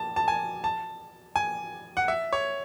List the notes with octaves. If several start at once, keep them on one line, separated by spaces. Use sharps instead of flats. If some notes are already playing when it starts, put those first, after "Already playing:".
Already playing: A5
A5
G#5
A5
G#5
F#5
E5
C#5